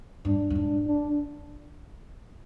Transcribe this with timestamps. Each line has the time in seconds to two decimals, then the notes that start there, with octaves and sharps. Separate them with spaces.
0.25 G2 D4
0.50 G2
0.55 G#2 D4
0.87 D4